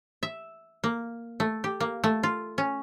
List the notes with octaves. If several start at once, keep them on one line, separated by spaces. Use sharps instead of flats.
E5
A#3
A3
G4
A#3
A3
F4
C#4